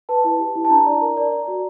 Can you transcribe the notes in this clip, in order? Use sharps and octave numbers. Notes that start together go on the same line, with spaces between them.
B4 A5
E4
G4
E4
A5
D4 A#5
D5
A#4
D5
D5
F#4